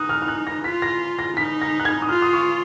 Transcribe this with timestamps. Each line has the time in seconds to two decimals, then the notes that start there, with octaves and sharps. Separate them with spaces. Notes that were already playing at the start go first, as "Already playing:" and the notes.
Already playing: D#4 D#6 F#6
0.09 F6
0.22 F6
0.28 F#6
0.47 A#6
0.64 F4 B6
0.82 A#6
1.19 A#6
1.36 D#4 B6
1.62 A#6
1.80 F#6
1.85 G#6
2.02 D#6
2.09 F4 F6
2.22 D#6
2.33 C#6